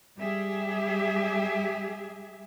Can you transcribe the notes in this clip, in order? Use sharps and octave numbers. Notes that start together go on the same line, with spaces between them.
G3 G4 G#4 E5